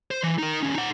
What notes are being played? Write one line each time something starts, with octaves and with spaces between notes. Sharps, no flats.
C5
E3
D#4 A#4
D#2 C#4
D#4 F#5